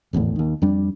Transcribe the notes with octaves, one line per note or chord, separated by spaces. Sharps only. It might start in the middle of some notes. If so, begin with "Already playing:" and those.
D1 G#1 E2 A2
D#2 D#3
F2 G3 D4